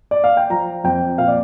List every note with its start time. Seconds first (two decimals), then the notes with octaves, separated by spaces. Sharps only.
0.11 D5
0.24 F5
0.37 G5
0.50 F3 A#5
0.84 F2 G5
1.18 A#2 F5
1.28 D5